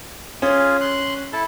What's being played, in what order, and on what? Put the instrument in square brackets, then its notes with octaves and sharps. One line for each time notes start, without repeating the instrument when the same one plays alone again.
[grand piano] C#4 [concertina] F4 G#4
[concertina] C6 F#6
E4 A4 A5